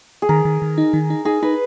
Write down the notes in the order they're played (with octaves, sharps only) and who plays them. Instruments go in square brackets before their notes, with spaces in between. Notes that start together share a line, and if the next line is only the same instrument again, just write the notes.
[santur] G#4
[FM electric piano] D#3 [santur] A#4
[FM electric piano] D#3
D#3
D#4
D#3
D#4
[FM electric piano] D#4 [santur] G#4
[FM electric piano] D#4 [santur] B4